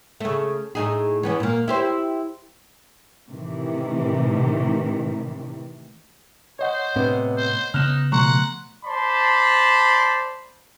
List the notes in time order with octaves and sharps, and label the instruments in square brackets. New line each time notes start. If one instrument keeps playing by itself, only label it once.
[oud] C#3 A3
A2 D#4 G#4
E3 B3 C#4
A#2 A#3
E4 G4 C5
[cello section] A2 C3 D#3 E3
[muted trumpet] C5 [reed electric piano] C#5 D#5 F#5
[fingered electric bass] A2 [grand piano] C3 B3
[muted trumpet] C5
[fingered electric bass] C#3 B3 [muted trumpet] D#4 [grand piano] F6 F#6 E7
[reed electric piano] B2 F3 A3 [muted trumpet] F#5 [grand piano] A#5 C6 C#6
[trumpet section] C5 D5 A5 B5 C6